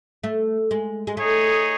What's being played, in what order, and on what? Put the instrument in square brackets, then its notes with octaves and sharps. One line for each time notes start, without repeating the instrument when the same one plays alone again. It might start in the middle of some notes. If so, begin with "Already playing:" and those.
[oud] A3
G#3
G#3
[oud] A3 [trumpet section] D#4 G#4 C#5